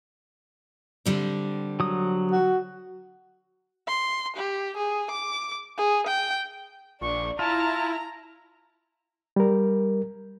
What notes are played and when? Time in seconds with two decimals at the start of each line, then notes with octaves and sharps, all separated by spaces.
1.05 D3 G3 C4
1.80 F#3 D#6
2.31 F#4
3.87 C6
4.36 G4
4.77 G#4
5.11 D6
5.77 G#4
6.07 G5
7.01 A#1 D4 C#6
7.39 E4 F4 A5 A#5
9.36 G3 A#4